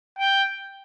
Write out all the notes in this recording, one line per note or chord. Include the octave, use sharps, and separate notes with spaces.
G5